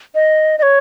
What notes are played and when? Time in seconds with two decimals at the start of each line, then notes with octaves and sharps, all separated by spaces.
0.15 D#5
0.58 D#5
0.63 C#5